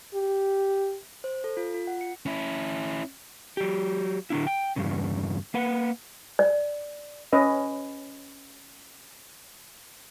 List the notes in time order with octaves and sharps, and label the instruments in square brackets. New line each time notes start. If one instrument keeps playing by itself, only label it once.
[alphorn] G4
[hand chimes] C5
A4
F4
F4
F#5
C#7
[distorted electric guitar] C#4 E4
[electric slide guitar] F#3 G4
D3 D4 E4
G5
E2 G2 C#3
A#3 B4 F#5
[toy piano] D5
[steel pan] C#4 B4 D#5